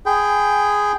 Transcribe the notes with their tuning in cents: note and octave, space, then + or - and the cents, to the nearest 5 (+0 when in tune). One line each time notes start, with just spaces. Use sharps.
G#4 +0 G5 +0 B5 +40